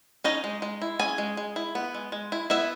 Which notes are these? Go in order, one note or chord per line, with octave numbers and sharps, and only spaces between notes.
C#4 D#4 D#5
G#3
G#3
E4
C#4 G#4 G#5
G#3
G#3
E4
B3
G#3
G#3
E4
B3 E4 E5